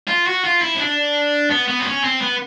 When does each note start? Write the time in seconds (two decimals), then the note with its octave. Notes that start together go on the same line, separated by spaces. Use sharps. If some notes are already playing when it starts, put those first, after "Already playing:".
0.08 F4
0.27 F#4
0.44 F4
0.62 E4
0.75 C#4
0.79 D4
1.50 B3
1.68 B3
1.80 C4
1.85 C#4
2.04 C4
2.22 B3